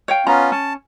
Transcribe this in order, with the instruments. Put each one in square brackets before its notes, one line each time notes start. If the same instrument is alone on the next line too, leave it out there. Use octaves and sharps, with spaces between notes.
[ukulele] C#5 F5 G5
[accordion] B3 C#4 F4 [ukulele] A#5
[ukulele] C#4 [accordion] A5